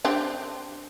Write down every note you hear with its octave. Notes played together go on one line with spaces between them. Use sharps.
C4 D4 G4